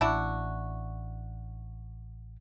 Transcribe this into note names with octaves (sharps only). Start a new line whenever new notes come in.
A1 D4 E4 F#4